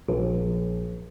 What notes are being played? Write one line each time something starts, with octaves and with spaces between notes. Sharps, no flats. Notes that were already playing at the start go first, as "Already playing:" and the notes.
A#1